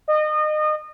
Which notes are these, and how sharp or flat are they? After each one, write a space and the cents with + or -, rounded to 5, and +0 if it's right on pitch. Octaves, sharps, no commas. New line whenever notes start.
D#5 -30